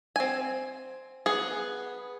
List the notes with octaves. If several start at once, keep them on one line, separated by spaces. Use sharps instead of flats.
C4 G#5
B3 G#4